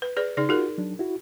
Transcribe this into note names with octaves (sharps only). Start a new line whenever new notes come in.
B4
G#4 B4 D5
C#3 D#4 G#4 D5
D#4 F4 F#4 G#4 A#4
F#3 D4
E4 F#4